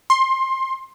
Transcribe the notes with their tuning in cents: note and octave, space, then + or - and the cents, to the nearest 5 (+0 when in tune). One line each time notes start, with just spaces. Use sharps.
C6 +20